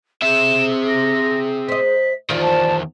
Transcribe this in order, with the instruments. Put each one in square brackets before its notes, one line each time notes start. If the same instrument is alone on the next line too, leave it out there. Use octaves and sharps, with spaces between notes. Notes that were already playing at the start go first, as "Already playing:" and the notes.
[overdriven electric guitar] C4 E5 [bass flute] G#4 [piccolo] E7
[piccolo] A#6
[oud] C5 D#5 [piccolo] B6
[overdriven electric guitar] E2 D#3 [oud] F4 C5 [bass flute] D5
[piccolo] A5